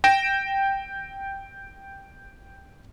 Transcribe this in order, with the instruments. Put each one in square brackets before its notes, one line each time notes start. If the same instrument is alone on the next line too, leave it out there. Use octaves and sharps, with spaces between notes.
[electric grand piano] G5 A#6 D7 E7